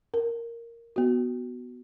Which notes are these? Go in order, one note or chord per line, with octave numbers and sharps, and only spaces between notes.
A#4
B3 F#4